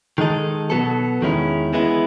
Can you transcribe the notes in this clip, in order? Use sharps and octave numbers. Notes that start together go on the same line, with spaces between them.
D#3 G#3 D#4 A4
B2 F#3 B3 F#4 A4
E2 D#3 G#3 C#4 E4
E3 G#3 B3 E4